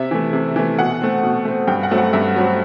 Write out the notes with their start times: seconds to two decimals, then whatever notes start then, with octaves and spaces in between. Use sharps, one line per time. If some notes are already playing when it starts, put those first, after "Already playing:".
Already playing: C3 E5
0.11 E3 A3
0.33 C3
0.56 E3 A3
0.79 B2 F#5
1.01 A3 C4
1.23 B2
1.45 A3 C4
1.68 G2 G5
1.83 F#5
1.91 F#3 A3 C4
1.98 F#5
2.13 G2 E5
2.36 F#3 A3 C4